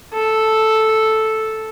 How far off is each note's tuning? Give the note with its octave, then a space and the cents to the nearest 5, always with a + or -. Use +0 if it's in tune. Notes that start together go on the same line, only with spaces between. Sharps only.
A4 -5